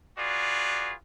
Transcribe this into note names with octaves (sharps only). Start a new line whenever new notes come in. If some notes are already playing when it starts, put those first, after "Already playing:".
F4 F#4 G#4 B4 D5